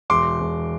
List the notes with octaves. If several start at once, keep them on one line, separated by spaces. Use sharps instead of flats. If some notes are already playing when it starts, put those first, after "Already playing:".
E1 C6 D6
E1